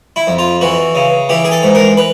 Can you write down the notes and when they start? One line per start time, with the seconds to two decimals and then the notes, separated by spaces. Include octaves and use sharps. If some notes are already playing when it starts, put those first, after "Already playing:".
0.16 E4
0.27 F2
0.39 F4
0.61 E3 F#4
0.95 C#3
1.29 E3 G4
1.45 G#4
1.52 A4
1.63 G#2
1.75 A#4
1.97 B4